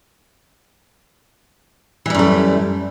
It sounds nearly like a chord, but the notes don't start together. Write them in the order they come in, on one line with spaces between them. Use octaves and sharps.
E3 G3 F#2 A3